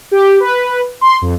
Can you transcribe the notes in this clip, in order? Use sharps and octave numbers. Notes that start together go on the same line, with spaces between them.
G4
B4
C6
F2